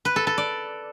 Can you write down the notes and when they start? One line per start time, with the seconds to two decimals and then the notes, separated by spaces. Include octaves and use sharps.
0.05 B4
0.16 A4
0.27 A4
0.38 D5